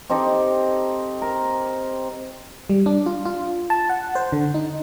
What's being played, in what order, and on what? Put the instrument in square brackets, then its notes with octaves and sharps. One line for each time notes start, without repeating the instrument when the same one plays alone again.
[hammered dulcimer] C4 D#4 G4 A4
A#4
[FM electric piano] G3
D4
F4
F4
A5
F#5
C5
D3
D#4